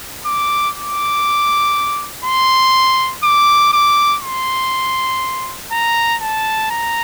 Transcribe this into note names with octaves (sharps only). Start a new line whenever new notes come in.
D6
D6
C6
D6
D6
C6
A#5
A5
A#5